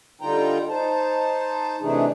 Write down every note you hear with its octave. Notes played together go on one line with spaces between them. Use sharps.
D3 G3 D#4 F4 G5 A#5
D#4 C5 A5
C3 E3 A3 D4 D#4 G#4